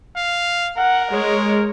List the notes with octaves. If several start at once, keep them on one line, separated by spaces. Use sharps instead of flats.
F5
A#4 F#5
G#3 C#5